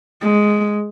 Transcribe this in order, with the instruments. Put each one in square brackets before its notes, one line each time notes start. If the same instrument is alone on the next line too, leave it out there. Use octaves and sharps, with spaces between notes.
[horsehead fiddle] G#3